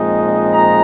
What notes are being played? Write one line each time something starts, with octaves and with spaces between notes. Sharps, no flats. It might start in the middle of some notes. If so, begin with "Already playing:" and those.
Already playing: A#2 F3 G#3 C4 D#4
A#5